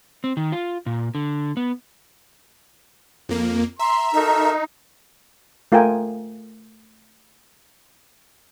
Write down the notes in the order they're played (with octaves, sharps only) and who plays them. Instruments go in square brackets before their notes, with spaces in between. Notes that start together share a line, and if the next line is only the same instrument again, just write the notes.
[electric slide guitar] C4
D#3
F4
A#2
D3
B3
[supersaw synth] F2 A#3
[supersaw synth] E5 [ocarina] A#5 [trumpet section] C6
[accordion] D#4 [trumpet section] F#4 A4 A#4 [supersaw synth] E5
[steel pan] A3 F4 A4 A#4 G5 G#5